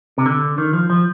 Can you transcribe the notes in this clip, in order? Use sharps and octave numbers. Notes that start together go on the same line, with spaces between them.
C3
D3
D#3
F3
F3